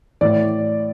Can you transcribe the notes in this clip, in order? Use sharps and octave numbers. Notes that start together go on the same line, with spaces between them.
A2 E3 D5